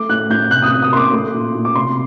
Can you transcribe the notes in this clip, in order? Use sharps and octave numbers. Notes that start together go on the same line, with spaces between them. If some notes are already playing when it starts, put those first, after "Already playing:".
Already playing: A3 D6
A2 F#6
A2 G6
C3 F#6
D#6
F#6
C3
D#6
A#3 C6 D6
A3
A#2
A#2
D6
C3 C6